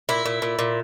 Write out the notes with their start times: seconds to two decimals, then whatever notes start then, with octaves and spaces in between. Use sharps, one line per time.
0.09 A#2 E4
0.25 A#2
0.42 A#2
0.59 A#2